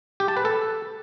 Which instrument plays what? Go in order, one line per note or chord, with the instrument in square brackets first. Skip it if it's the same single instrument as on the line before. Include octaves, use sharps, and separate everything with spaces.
[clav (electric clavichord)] G4
A5
B4
A4